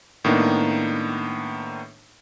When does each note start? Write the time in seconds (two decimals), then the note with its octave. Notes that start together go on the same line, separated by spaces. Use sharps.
0.25 A2 D#3 A#3 B3 D4 D#4